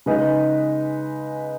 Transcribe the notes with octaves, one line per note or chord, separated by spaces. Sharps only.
C#3 G#3 D#4 B4